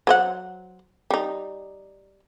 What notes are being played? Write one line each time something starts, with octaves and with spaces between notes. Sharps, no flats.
F#3 C5 F#5
G3 D#4